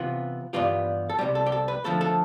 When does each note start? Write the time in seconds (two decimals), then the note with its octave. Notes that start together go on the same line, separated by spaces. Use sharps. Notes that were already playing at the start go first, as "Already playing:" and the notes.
Already playing: C3 E3 B3 F4
0.53 G2 E3 G3 B3 F4 G4
1.10 A4
1.19 C2 C3 G3 G4
1.35 A4
1.46 G4
1.52 A4
1.68 B4
1.84 D3 F3 A3 A4
2.01 A4